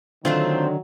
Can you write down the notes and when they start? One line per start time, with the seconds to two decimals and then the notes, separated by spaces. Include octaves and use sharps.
0.25 D3 D#3 F#3 A3 C4 D4 F4